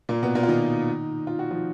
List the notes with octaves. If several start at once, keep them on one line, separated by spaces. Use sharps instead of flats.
A#2 A#3
B2 B3
A#2 A#3
F4
D#3 D#4
F4
F#4
F3 F4